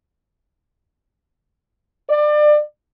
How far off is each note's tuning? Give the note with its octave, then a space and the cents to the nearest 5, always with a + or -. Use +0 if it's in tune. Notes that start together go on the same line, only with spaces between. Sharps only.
D5 +30